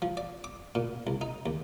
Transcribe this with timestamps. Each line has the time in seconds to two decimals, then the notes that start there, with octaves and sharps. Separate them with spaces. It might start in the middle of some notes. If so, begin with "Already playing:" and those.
0.02 F3
0.17 D5
0.44 D6
0.75 A#2
1.07 C2
1.21 D#4
1.46 D#2